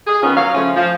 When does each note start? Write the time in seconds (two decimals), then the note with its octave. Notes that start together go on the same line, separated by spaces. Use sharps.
0.07 G#4
0.23 D#3 B3 C#4 F4
0.36 F#3 C#5 F5
0.54 C#3 F3 A3 C#4
0.76 F3